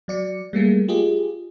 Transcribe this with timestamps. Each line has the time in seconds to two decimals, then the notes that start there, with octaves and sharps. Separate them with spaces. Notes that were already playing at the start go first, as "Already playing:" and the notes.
0.08 F#3 D5 C#7
0.53 G3 A3 A#3 G#4
0.88 F4 G4 G#4 D#5